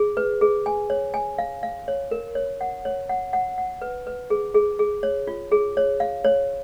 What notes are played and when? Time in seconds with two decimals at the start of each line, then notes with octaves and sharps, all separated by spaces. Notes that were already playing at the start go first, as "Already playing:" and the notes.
Already playing: G#4
0.17 B4
0.41 G#4
0.66 G#5
0.90 C#5
1.14 G#5
1.38 F5
1.63 F5
1.88 C#5
2.11 A#4
2.35 C#5
2.61 F#5
2.85 C#5
3.09 F#5
3.33 F#5
3.58 F#5
3.82 B4
4.07 B4
4.30 G#4
4.54 G#4
4.79 G#4
5.03 C#5
5.27 F4
5.51 G#4
5.77 C#5
6.00 F5
6.24 C#5